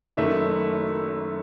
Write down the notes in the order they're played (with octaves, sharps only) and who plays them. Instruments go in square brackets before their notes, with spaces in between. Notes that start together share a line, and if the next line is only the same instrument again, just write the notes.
[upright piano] F#1 F#2 D#3 A3 E5